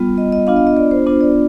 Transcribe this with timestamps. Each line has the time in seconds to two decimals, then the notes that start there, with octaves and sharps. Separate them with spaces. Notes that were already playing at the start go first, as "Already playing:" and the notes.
Already playing: G3 B3 F4
0.18 D#5
0.33 D#5
0.47 B3 D4 F4 F5
0.56 D#5
0.67 D#5
0.77 D5
0.91 C5
1.06 B3 D4 F4 C5
1.21 D5